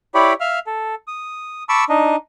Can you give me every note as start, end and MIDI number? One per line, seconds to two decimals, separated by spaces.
0.15 0.34 64
0.15 0.34 67
0.15 0.34 73
0.15 0.34 74
0.15 0.34 83
0.40 0.59 76
0.40 0.59 77
0.40 0.59 89
0.67 0.95 69
1.07 1.63 87
1.69 1.84 81
1.69 1.84 83
1.69 1.84 85
1.69 1.84 86
1.69 1.84 88
1.89 2.16 62
1.89 2.16 63
1.89 2.16 75